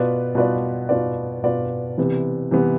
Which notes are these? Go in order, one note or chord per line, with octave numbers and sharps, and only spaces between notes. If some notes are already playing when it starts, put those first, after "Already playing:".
Already playing: B2 B3 F4 B4 D5
B2 B3 F4 B4 D5
B2 B3 F4 B4 D5
B2 B3 F4 B4 D5
C3 E3 B3
C3 E3 B3